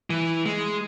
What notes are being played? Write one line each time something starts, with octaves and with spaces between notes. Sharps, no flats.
E3
G#3